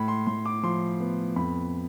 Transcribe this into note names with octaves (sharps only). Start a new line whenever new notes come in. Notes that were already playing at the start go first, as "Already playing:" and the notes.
Already playing: A2 B5
C6
A2 C6
D6
F3 C6
B3
F2 B5